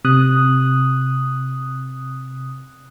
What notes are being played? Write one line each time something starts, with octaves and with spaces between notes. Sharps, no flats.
C3 D#6 F#6